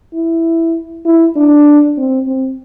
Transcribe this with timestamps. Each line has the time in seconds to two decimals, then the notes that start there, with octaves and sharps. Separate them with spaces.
0.14 E4
1.06 E4
1.37 D4
1.97 C4
2.27 C4